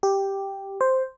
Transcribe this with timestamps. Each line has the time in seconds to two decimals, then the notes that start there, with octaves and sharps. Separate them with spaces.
0.03 G4
0.81 C5